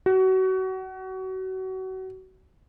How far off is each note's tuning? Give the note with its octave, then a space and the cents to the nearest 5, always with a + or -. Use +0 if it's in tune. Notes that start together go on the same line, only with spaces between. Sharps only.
F#4 +30